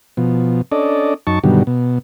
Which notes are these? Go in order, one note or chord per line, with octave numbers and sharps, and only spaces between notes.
B2 F3
C#4 D4 A4 D5 D#5
F#2 D#4 A5 C#6
G2 B2 D3 D#3 F#3 G3
B2